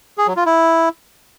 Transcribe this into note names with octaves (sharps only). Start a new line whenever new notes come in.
G#4
F#3
F4
E4